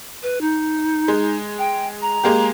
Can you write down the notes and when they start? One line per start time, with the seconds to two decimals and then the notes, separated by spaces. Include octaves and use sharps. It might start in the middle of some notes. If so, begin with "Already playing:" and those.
0.23 B4
0.41 D#4
1.08 G#3
1.58 G5
2.02 A#5
2.24 G#3 A#3 G4